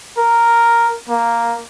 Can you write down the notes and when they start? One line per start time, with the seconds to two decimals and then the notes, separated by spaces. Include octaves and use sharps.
0.17 A#4
1.09 A#3